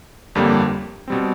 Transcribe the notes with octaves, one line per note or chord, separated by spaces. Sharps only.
G1 F2 D3 G3 A#3
B2 G3 C4